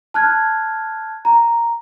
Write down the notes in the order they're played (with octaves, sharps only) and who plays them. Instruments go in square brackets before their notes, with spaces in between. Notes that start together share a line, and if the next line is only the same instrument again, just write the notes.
[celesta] A5 F6 F#6 G#6
A#5